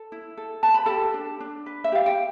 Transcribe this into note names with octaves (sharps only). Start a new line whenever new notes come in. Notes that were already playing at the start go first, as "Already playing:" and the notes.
Already playing: A4
E4
A4
B4 A5
B5
G4 A4 A5
D4
D4
B4
E5
G4 F5
G5